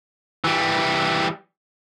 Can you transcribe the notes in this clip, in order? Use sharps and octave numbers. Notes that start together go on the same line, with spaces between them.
E3 G3